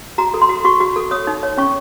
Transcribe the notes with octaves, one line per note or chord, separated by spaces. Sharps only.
F#4 A#5
A4
C6
F#4
F#4 C#6
F#4
A4
C#5 D#6
D#4
C#5
C#4 C#6